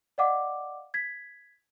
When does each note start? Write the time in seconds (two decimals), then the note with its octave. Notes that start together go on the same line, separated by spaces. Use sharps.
0.18 D5 D#5 F5 F#5 D6
0.94 G#6 B6